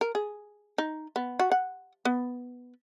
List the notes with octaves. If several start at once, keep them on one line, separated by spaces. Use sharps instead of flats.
A#4
G#4
D#4
B3
F#4
F#5
B3